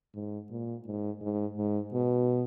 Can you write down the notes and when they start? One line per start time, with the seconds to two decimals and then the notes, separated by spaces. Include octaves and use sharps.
0.14 G#2
0.50 A#2
0.86 G#2
1.21 G#2
1.57 G#2
1.93 B2